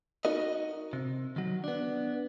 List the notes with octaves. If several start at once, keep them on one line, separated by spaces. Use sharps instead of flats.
D#4 F#4 A#4 D#5
C3
D#3 F#3
B3 D4